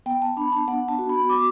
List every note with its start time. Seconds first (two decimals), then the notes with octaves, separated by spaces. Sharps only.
0.06 B3 G5
0.22 A5
0.37 D4 B5
0.52 A5
0.68 B3 F#5
0.88 A5
0.99 F#4
1.09 B5
1.29 B3 D6